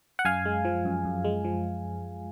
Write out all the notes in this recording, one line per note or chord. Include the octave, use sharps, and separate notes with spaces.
F#5
F#2 F5 G#5
G#3
F3
F#2
F#2
G#3
F3